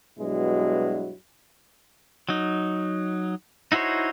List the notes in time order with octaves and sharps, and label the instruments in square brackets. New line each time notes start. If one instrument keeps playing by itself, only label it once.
[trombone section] G2 B2 F#3 G#3 E4
[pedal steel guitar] F#3 D#4
D#4 E4 F#4 C5 C#5